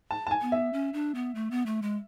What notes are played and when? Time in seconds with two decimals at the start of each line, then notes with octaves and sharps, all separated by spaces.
0.11 A5
0.27 A5
0.31 G#5
0.42 B3
0.52 E5
0.73 C#4
0.93 D4
1.15 B3
1.35 A3
1.51 B3
1.66 A3
1.82 G#3